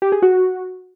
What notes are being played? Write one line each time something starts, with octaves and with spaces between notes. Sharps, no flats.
G4
G#4
F#4